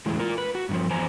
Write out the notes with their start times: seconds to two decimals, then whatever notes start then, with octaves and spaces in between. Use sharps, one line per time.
0.06 E2 A2 E3 G#3
0.20 F4 A#4
0.38 B4
0.55 F#4
0.69 G2 D#3 F3
0.90 E2 B3 C5 G#5 A#5